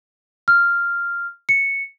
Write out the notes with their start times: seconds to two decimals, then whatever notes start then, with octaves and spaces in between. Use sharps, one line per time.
0.48 F6
1.49 C#7